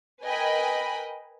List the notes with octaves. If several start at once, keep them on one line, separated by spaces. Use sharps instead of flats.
A#4 B4 D#5 G5 G#5 B5